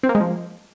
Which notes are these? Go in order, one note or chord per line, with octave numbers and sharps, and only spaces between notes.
C4
A#3
G#3
F3